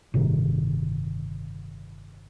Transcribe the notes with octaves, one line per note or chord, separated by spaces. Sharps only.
G1 A2 C3 D#3